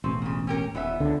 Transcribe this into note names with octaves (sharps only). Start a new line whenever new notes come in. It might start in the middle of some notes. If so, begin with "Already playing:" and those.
E1 A1 C4 C#4
A#2 C#3
C#4 G4 A#4
D#1 E3 B3 E5
C#2 D3